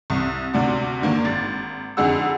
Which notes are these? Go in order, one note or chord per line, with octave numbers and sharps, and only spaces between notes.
C2
D2 C3 D4 F#4
D3 D#3 A#3 D4
G#1 A6
F2 D3 D#4 G#4 F#5 E6